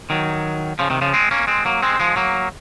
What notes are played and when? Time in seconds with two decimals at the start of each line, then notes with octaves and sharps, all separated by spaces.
0.10 D#3 F#3
0.79 C#3 F3
0.90 C3 D#3
1.01 C#3 F3
1.14 G#3 C4
1.31 A#3 C#4
1.47 G#3 C4
1.65 F#3 A#3
1.82 G#3 C4
2.00 F3 G#3
2.16 F#3 A#3